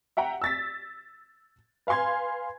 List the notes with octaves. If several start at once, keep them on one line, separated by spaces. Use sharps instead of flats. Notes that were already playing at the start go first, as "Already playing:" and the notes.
E5 F#5 G5 A#5
E6 A6 B6
B4 F5 G#5 C6 G#6